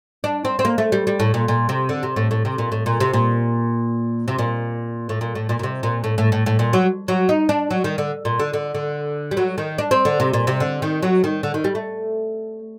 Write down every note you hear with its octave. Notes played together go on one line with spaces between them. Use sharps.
D4
C4
C4
A#3
A3
G3
G3
A2
A#2
A#2
C3
D3
C3
A2
A2
C3
A#2
A2
A#2
C3
A#2
C3
A#2
A2
A#2
A2
A#2
A#2
C3
A#2
A2
A2
A2
A2
A#2
F#3
F#3
D#4
D4
F#3
D#3
D3
A#2
D3
D3
D3
G3
F#3
D#3
D4
C4
D3
C3
A#2
C3
D3
D#3
F#3
D#3
D3
D#3
G3
A3